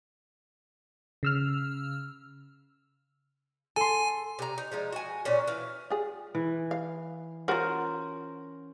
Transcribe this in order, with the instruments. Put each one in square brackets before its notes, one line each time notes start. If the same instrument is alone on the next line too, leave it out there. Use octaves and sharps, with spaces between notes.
[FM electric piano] C#3 E6 F6
[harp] A4 C6 [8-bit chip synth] G#5
[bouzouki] C3 A#5
D#4
F3 G#3 D#4
F#4 G#5
A#2 C#4 F#4
E3 F5
[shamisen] F4 G#4
[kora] E3
[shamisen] F5
[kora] C#4 A#4 C5 [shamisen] F4 F#4